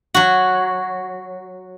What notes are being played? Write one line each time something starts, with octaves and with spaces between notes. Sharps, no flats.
F#3 F#4